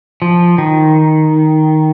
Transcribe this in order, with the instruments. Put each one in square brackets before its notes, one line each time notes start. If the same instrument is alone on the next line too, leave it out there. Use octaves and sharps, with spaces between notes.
[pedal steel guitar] F3
D#3